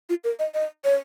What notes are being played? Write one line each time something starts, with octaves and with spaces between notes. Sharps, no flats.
F4
A#4
D#5
D#5
C#5